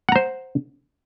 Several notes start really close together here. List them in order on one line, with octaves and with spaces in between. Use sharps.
F#5 A#5 C5